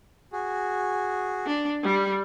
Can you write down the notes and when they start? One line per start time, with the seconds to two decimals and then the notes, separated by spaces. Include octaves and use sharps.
0.32 F#4 G#4
1.46 D4
1.83 G3